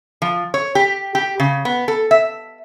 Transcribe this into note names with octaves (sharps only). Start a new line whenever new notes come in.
F3
C#5
G4
G4
C#3
B3
A4
E5